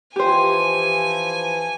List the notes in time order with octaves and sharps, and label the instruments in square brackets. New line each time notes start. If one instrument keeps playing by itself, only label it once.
[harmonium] E3 F3 [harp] G4 C5 [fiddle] G#5